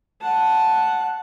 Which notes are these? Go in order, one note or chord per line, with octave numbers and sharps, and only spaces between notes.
F#5 A5